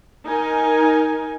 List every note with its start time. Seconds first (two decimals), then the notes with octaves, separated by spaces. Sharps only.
0.25 D#4 A#4 G#5